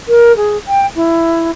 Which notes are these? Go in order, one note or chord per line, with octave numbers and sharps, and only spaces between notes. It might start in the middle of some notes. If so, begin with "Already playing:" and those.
A#4
G#4
G5
E4